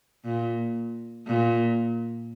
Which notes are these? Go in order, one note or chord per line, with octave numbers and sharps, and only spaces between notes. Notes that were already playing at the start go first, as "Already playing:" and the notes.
A#2
A#2